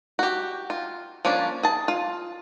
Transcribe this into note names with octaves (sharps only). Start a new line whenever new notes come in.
F#4 G4
F4
F3 A#3 C#4 D4
G#4 A5
F4